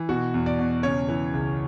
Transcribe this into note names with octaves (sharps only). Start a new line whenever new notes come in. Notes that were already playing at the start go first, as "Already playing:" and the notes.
Already playing: E3
B2 F#4
E2
D5
B2
C#3 C#5
E3
C#2